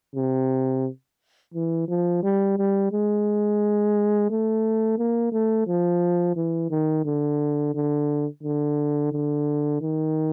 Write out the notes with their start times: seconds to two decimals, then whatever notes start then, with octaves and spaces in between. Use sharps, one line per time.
0.15 C3
1.54 E3
1.88 F3
2.23 G3
2.58 G3
2.92 G#3
4.30 A3
4.98 A#3
5.32 A3
5.67 F3
6.36 E3
6.70 D#3
7.05 D3
7.74 D3
8.43 D3
9.12 D3
9.81 D#3